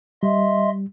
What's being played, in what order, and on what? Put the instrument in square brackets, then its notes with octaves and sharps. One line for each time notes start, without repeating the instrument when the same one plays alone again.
[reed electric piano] G3 [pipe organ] D#5 E5 C6